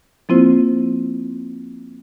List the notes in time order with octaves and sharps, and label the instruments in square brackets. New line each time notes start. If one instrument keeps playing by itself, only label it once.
[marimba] F3 A#3 C4 E4 F4 C5